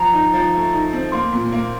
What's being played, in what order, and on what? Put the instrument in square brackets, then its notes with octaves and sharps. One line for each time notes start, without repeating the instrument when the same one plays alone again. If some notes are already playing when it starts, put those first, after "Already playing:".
Already playing: [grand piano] F3 [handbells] A#5
[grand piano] D#4
F3
A3
D#4
C4
[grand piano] A#3 [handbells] C6
[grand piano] A#2
A#3